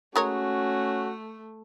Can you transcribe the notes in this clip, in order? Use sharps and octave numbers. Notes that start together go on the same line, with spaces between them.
G#3 A3 C#4 F#4 A#4 C#5